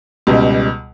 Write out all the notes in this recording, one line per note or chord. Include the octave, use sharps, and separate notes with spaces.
C#2 B2 G3